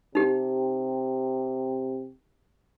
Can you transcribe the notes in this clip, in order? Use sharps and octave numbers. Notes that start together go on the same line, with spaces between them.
C3 D#4 G4